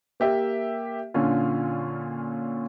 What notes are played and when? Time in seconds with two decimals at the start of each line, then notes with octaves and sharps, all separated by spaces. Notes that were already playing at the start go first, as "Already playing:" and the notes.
0.20 A#3 G4 E5
1.14 A#2 D3 C#4 F4